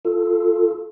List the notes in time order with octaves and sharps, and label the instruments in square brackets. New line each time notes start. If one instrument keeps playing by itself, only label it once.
[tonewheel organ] F4 A4